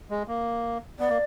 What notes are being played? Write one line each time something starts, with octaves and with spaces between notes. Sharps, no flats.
G#3
A#3
B3 D5
A#3